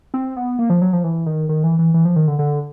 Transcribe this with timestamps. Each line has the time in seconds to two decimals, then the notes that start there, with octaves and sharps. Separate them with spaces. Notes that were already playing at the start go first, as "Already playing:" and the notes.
0.14 C4
0.36 B3
0.59 A#3
0.70 F3
0.82 F#3
0.93 F3
1.04 E3
1.26 D#3
1.49 D#3
1.64 E3
1.79 E3
1.94 E3
2.05 F3
2.16 D#3
2.28 D3
2.39 D3